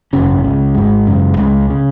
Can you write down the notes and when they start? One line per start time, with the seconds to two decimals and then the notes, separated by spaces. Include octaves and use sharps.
0.13 G#1 F#2 C#3 C#4
0.44 C#2 C#3
0.75 G#1 G#2 G#3
1.07 F#1 F#2 C#3
1.37 C#2 C#3 G#3
1.70 C#3